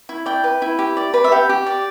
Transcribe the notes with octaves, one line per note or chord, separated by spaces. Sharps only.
E4
D5 G5
B4
E4
G4
D5
B4
E5
G4 F#5
G4
D5